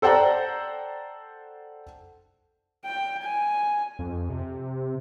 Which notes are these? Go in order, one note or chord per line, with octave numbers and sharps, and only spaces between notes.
A4 C5 D5 F#5 G5 A#5
G5
G#5
F2
C3